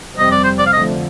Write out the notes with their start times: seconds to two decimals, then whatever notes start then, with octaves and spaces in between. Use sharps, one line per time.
0.15 F2 C3 G3 C4 D#5
0.32 D5
0.44 C5
0.59 D5
0.67 F5
0.73 F2 D3 F3 A3 D#5